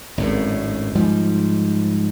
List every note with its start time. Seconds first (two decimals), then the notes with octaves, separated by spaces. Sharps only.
0.18 G#1 F#2 A2
0.95 G#2 F3 G3